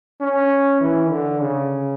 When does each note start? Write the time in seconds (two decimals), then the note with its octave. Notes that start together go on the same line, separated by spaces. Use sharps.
0.21 C#4
0.80 E3
1.10 D3
1.40 C#3